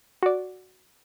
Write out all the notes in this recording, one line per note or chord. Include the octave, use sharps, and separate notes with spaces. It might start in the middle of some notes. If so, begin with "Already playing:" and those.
F#4 D5